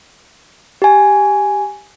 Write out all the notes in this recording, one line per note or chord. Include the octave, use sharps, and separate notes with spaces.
G4 G#5